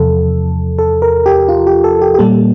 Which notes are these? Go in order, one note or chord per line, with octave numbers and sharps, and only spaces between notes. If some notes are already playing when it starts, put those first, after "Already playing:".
Already playing: E2 C3 F3 A4
A4
A#4
G4
F4
G4
A4
G4
G4
A#2 G3 A#3 A4